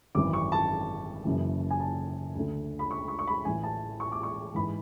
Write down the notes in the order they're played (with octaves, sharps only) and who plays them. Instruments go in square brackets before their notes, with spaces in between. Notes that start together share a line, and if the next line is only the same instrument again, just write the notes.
[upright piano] G#1 F#2 E3 D6
C#6
A5
F#1 F#2 C#3 E3
G#5
A5
D2 D3
B5
C#6
C#6
C#6
B5
A1 A2 E3 G#5
A5
C#6
D6
C#6
G#2 E3 B5